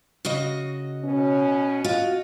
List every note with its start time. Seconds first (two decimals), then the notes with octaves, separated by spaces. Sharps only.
0.25 C#3 F#4 D#5
1.04 B2 C#4
1.84 F4 F#4 D#5